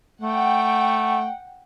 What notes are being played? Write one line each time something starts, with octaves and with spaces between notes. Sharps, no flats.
A3 F#5 G5